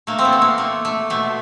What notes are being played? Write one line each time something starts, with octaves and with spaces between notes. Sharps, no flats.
A3 A#3
C4
B3
A3
A#3
A3
A3
B2 A3